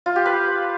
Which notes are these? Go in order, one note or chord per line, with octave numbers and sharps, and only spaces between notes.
F4
G4
B4